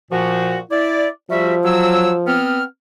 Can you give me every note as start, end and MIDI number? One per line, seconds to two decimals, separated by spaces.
0.11 0.59 46
0.11 0.59 53
0.11 0.59 66
0.71 1.08 64
0.71 1.08 74
1.30 2.39 53
1.30 1.55 55
1.30 1.55 66
1.30 1.55 76
1.65 2.11 54
1.65 2.11 88
2.26 2.64 59
2.26 2.64 60
2.26 2.64 89